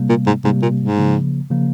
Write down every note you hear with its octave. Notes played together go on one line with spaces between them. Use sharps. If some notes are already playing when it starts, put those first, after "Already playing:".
Already playing: C3 G3 A#3
A#2
G#2
G#2 C3 G3 A#3
A#2
G#2
C#3 F3 A#3
C#3 F3 A#3